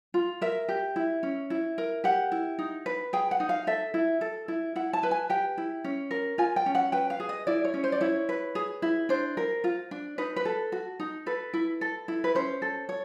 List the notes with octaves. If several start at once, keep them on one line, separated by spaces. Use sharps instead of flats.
F4
A#4 E5
G4
E4
C#4
E4
A#4
G4 F#5
E4
D#4
B4
G#4 G5
F#5
D#4
F5
A4 E5
E4
A4
E4
E4 F#5
A5
B4
G#5
G4 G5
E4
C#4
A#4
F4 G#5
G5
C#4
F#5
B4 G5
F5
G#4
D#5
E4 D5
C#5
C#4
C5
D5
E4 C#5
B4
G#4
E4
D4 C5
A#4
F4
D4
D#4 B4
B4
A4
F#4
D#4
A4 B4
E4
A4
E4
B4
C#4 C5
A4
C#5